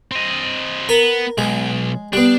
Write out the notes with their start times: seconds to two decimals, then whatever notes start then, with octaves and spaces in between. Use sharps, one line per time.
0.11 C4 D#5
0.89 B3 A#4
1.38 B1 G#3
2.13 G3 B3 D4